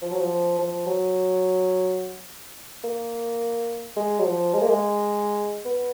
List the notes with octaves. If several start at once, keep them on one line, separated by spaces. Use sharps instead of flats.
F3
F#3
F3
F3
F#3
A#3
G#3
F#3
F3
G#3
A#3
G#3
B3